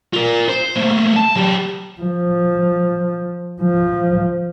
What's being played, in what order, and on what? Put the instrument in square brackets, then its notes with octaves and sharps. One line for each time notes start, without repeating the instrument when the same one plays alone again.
[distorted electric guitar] F4 A#4
C5
A3 A#3
A5
F#3 G4
[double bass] F3
F3